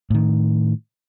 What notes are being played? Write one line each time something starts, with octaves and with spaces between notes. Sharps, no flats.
A2 D#3